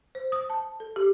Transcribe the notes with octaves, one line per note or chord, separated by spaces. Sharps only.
C5
D#6
A5
A4
G4